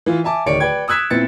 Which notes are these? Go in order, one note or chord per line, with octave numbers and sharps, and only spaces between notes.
E3 F4
E5 G#5 A5 D6
D1 D#3 C#5 D5 C#7 D7
B4 D5 G5 G#6
D#6 E6 F#6 G#6 B6 E7
A#2 B3 C4 E4 A6 C#7